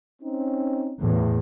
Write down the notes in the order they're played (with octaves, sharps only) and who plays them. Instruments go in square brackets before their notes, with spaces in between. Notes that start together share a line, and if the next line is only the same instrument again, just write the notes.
[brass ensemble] C4 C#4 D#4
[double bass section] E2 A2